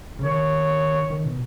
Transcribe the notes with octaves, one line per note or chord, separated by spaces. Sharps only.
C#3
D#3 C#5
D#3
B2